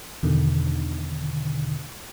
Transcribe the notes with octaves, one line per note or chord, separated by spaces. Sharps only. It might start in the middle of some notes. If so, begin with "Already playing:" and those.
E2 B2 D3 D#3